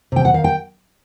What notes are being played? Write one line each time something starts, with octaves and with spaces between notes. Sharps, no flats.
C3 G5
F#5
D#3 F5
G5